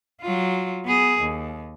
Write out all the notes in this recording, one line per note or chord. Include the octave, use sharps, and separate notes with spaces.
F#3 F4
B3 G#4
D#2